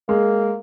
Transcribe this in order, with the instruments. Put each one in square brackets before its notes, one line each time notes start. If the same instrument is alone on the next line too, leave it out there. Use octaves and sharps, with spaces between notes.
[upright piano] G#3 [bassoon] A#3